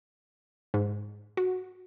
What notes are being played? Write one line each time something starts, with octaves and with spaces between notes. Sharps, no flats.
G#2
F#4